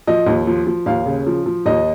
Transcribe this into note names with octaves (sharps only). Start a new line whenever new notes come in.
F3 D#5
D#2
F3
F3
D#2 F5
C#3
F3
F3
D#2 D#5